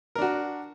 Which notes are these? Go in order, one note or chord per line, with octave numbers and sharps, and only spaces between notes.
D4 F#4 A#4